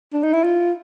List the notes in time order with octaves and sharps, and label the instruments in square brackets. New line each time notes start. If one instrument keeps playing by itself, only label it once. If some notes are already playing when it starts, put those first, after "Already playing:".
[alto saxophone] D4
D#4
E4
F4